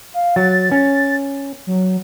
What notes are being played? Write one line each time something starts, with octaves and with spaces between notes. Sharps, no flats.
F5
F#3 A6
C#4
F#3